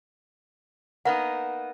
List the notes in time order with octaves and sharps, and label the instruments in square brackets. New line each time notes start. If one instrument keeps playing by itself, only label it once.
[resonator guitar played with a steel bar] A#3 B3 D#4 [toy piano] F#5